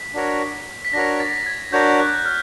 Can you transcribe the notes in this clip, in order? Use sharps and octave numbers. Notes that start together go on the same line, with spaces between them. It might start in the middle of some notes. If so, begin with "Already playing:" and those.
Already playing: B6
D4 F#4 A#4 C#5
B6
D4 F#4 A#4 C#5 A#6
A6
G#6
D4 F#4 A#4 C#5 G6
F#6
F6